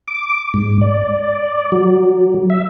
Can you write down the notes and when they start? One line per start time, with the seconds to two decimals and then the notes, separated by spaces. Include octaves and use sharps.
0.08 D6
0.54 G#2
0.81 D5
1.72 F#3
2.50 E5